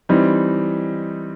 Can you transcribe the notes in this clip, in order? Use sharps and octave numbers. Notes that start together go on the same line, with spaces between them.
E3 G3 C4 D#4